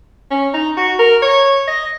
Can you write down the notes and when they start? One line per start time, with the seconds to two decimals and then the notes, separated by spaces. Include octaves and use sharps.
0.31 C#4
0.54 D#4
0.77 F#4
0.99 A#4
1.22 C#5
1.68 D#5